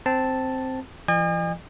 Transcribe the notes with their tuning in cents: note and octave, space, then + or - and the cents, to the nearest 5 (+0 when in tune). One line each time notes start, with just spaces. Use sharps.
C4 +0 A5 +0
F3 -45 D#5 -40 G#5 -45